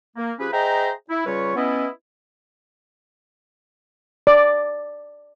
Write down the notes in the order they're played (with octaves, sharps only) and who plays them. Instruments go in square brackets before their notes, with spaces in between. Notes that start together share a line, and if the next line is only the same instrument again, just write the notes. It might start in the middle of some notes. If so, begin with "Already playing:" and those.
[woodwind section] A#3
F3 C#4 G4 G#4 B4
G#4 C5 D#5 E5 G5 A#5
E4
C#3 G3 F4 B4 C#5
B3 C#4 E4 D#5
[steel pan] D5